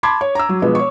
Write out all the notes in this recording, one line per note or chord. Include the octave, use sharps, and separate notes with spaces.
A5 B5 C6 D6 G#6
C#5
A#5 E6
F#3
B2 F3 G#3 B3
C#5 C#6